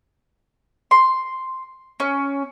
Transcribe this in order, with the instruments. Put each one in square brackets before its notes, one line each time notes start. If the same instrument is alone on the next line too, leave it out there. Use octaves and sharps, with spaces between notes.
[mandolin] C6
C#4